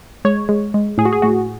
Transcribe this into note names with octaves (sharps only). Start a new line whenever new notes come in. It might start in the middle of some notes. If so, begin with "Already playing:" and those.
G#3 C#5
G#3
G#3
A2 G#4
F#4
G#4
A2 F#4